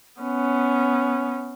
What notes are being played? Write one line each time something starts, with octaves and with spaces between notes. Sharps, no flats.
B3 C#4